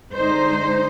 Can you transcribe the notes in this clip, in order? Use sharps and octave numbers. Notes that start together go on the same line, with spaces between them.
D3 G#3 D#4 C5